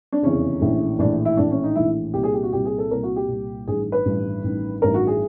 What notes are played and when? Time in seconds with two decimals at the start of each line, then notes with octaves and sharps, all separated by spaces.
0.12 D4
0.22 F1 E2 C#3 E3 C#4
0.61 A#1 A2 E3
0.99 A#1 A2 E3 D4
1.25 E4
1.37 A#1 A2 E3 D4
1.51 C#4
1.64 D#4
1.76 A#1 A2 E3 E4
2.14 C2 A#2 G4
2.23 G#4
2.34 G4
2.43 F#4
2.53 C2 A#2 G4
2.65 G#4
2.78 A4
2.91 C2 A#2 A#4
3.03 F#4
3.16 G4
3.28 C2 A#2
3.68 A1 G2 D#3 G#4
3.92 B4
4.05 A1 G2 D#3
4.44 A1 G2 D#3
4.82 A1 G2 D#3 A#4
4.94 F#4
5.07 G#4